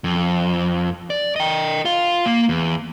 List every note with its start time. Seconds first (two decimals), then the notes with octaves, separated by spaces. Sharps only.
0.04 F2
1.10 D5
1.36 D#5 G5
1.85 F4 F5
2.26 A#3
2.49 E2